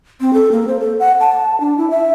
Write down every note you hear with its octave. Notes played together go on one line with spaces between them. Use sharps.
C4
A4
A#3
C5
A4
F#5
A5
D4
E4
E5